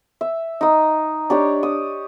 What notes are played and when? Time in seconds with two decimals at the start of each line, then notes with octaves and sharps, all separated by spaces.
0.21 E5
0.61 D#4 D#6
1.30 D4 G4 C#5
1.63 D#6